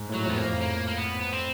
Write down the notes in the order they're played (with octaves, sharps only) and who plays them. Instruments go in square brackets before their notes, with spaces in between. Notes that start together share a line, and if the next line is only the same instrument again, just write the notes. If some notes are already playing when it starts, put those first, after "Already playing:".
Already playing: [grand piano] G#2
A2
[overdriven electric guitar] F#3
[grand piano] F2 [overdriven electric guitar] B3
[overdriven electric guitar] A#3
[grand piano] F2
[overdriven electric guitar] A#3
A#3
B3
B3
C4